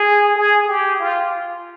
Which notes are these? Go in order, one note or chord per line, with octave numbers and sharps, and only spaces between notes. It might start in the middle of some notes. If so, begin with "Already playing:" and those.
Already playing: G#4
G#4
G4
F4